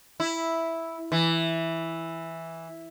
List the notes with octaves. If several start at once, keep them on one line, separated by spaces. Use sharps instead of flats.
E4
E3